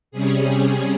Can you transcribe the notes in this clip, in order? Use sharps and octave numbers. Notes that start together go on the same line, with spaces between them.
C3 G3 C#4 G#4